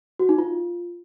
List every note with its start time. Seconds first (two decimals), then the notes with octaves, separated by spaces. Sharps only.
0.19 F#4
0.29 D#4
0.38 F4